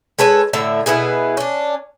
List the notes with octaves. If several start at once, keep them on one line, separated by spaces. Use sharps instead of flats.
G#3 A4 B4 C#5
A2 D3 E5
B2 B3 E4 G#4
C#4 D4